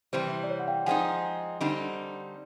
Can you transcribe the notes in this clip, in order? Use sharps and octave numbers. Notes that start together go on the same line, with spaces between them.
C3 E3 G3 C4 C5
D5
C#5
F#5
F5 G5
F3 G#3 C4 D#4 F#5 G#5
D3 G3 C4 D#4